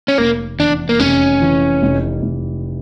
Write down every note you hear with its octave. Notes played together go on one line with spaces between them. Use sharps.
C#4
F1 A#3
E2 D4
A#3
F1 C#4
E3
F1
F1